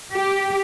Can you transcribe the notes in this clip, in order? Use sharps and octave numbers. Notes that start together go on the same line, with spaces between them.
G4